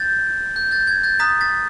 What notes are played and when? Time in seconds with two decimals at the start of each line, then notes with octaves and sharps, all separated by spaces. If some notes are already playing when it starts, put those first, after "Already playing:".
Already playing: G6 A6
0.56 G6
0.71 G6 A6
0.87 G#6
1.03 G6 A6
1.19 A#5 D#6 F#6 A6 B6
1.41 A6 B6